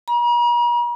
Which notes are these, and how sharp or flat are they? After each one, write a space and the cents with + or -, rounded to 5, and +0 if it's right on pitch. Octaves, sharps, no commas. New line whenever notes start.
A#5 +45